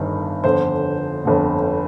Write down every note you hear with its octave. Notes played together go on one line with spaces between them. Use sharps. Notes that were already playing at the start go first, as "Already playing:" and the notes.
Already playing: G1 G2 D#3
G1 F2 D3 C5
G1 F2 D3